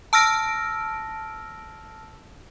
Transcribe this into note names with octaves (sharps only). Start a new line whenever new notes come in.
A5 E6 F6 A#6 D7